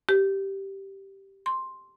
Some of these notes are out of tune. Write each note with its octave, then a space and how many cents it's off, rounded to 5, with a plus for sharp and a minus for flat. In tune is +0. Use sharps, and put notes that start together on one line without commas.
G4 -5
C6 +5